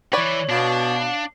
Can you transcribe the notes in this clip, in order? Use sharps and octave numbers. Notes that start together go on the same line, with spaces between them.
E3 B4 C#5 D5 B5
B2 D4 F5